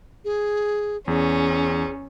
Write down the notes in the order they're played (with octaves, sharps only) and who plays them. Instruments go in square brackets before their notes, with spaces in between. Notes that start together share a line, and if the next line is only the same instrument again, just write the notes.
[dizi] G#4
[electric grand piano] E2 [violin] C#4 [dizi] G#4